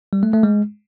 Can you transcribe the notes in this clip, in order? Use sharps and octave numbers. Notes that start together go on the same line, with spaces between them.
G3
A3
A3
G#3